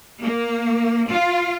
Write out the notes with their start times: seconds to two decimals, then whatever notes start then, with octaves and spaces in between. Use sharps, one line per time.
0.22 A#3
1.08 F4